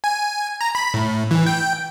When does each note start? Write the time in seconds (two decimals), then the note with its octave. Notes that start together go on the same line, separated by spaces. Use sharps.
0.04 G#5
0.61 A#5
0.75 B5
0.94 A2
1.31 E3
1.46 G5